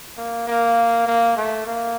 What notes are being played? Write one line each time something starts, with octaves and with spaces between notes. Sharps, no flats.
A#3
A#3
A#3
A3
A#3